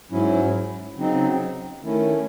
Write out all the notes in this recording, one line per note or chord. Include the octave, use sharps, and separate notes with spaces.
G#2 F#3 C#4 E4
C#3 F#3 C4 D#4
D#3 A3 C#4 E4